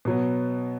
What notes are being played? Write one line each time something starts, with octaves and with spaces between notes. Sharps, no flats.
B2 F#3 B3